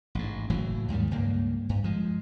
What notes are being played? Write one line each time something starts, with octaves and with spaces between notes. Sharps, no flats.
A1 G#2
F#1 A2 E3 F#3
D#2 G#2 D#3 G3
C#2 G2 A#3
G2
F3 G#3